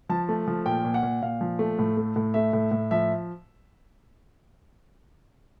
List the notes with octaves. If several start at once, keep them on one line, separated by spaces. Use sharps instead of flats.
F3 A5
A3
F3
A#2 G5
A#2
F#5
A#2
A#2 F5
F3
A3
A2
A3
A2
A3 E5
A2
A2
F3 E5